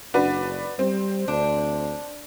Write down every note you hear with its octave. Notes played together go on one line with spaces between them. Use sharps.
F#1 D4 F#4 B4
G3 C4
D2 D4